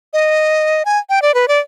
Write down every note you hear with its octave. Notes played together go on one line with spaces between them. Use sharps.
D#5
G#5
G5
D5
B4
D5